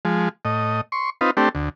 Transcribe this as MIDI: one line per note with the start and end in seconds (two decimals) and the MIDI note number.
0.05 0.29 53
0.05 0.29 56
0.45 0.81 45
0.45 0.81 75
0.92 1.10 84
0.92 1.10 85
1.21 1.31 60
1.21 1.31 63
1.21 1.31 65
1.21 1.31 71
1.37 1.49 57
1.37 1.49 60
1.37 1.49 62
1.37 1.49 67
1.55 1.69 38